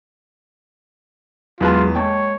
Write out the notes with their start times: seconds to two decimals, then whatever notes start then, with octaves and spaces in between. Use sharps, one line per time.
1.61 E2 F#3 G#3 F4 G#4 B4 A5
1.95 G#3 A#3 C#5 G5 A5